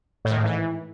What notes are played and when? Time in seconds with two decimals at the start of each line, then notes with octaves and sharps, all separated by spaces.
0.25 A2
0.31 D#3
0.37 G#2
0.43 E3